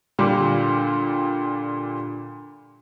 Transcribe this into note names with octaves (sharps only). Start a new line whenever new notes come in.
A#2 D3 G3